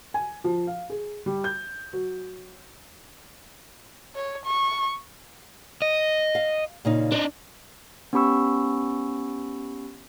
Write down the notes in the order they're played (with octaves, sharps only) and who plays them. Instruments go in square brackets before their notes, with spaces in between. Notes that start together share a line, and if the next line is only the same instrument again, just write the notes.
[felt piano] G#5
F3
F5
G#4
G3
G6
F#3
[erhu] C#5
C#6
[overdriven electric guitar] D#5
[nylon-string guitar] F5
A#2 C#3 D#4
[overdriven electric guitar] D4 D#4 [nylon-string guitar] C5
[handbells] B3 C#4 G4 B5 C#6 E6